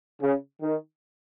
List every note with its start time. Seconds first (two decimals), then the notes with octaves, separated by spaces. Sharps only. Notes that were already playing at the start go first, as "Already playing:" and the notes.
0.21 C#3
0.62 D#3